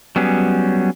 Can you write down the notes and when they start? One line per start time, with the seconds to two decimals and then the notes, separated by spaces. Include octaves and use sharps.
0.16 F#3 G3 B3 C#4 G#4